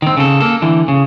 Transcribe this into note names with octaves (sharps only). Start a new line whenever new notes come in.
D#3 C4
C#3 A4
A#3 A4
D3 E3
C#3